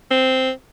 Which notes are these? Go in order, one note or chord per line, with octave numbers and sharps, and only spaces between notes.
C4